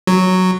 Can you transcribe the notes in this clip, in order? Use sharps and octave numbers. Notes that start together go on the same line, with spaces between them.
F#3